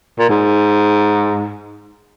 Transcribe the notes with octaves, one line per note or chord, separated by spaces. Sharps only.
A#2
G#2